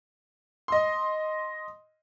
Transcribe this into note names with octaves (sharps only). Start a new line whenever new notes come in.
D#5 C6